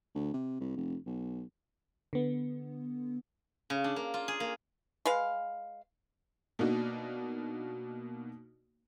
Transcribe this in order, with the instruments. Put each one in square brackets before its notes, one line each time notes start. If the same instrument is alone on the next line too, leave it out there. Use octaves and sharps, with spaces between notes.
[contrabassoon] D2
C3
C2
F1
B1
[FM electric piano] D3 B3
[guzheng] C#3
D4
A#3
F4
G#4
A#3
[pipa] G#3 B4 F5
[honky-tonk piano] B2 A#3 D4 D#4 F#4